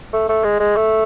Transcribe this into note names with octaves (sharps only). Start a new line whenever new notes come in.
A3
A3
G#3
G#3
A3